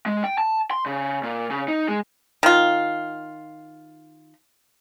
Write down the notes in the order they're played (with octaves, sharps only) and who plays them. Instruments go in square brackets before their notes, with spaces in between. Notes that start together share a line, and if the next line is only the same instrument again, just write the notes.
[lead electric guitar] G#3
G5
A5
C6
C#3
A#2
C#3
D#4
G#3
[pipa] D#3 F4